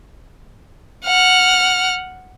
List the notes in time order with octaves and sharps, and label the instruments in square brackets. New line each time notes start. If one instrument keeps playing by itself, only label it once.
[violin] F#5 F6